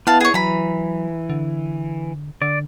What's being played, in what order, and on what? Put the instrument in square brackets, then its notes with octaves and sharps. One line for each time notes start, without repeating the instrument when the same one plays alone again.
[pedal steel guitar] B3 [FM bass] E4 [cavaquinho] F5 A5
[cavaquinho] G#4 C#5
[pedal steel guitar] E3 [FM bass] F#3 [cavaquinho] A#5 B5
[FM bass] D3
[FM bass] D3 [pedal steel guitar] D5